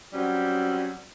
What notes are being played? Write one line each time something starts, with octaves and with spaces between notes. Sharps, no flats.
F#3 G3 C4 C#4 F#4